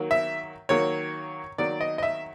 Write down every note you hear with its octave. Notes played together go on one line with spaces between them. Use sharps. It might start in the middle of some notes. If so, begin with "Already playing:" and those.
Already playing: D#3 F#3 A#3
E5
D#3 F#3 A#3 C#5
D#3 F#3 A#3 D5
D#5
D#5
E5